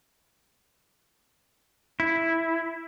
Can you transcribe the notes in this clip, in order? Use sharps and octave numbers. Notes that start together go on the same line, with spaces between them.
E4